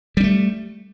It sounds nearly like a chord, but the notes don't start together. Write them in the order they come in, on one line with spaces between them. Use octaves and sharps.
G3 C#4 A3